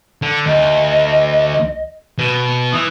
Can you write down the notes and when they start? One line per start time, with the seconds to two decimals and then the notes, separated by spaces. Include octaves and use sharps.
0.22 D3
0.46 D2 D#5
2.18 B2
2.73 E3 D#6